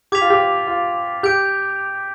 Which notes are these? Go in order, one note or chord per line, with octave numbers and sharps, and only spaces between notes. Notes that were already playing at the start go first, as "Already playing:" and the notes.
G4 D6 G#6 B6 F7
F4
G4
F4
G4 G6 D7